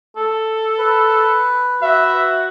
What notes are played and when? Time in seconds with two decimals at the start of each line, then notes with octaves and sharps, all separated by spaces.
0.16 A4
0.78 B4
1.83 F#4 E5